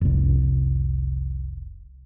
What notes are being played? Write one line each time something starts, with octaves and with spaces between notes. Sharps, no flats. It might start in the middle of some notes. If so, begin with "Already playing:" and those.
F1 C2